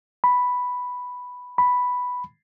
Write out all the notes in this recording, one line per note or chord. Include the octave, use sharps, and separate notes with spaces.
B5
B5